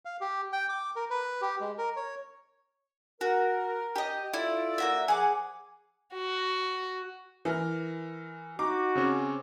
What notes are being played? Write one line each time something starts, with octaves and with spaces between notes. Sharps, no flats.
F5
G4
G5
D6
A#4
B4
G4
G#3
A#4
C#5
F#4 A#4
G4 D#5
E4 F4 A4 D5
A#3 F#4 E5
F3 G#4 F#5 D6
F#4
E3 A#4 F6
D#4 F#4 A#5 D6
C#3 C4 C#4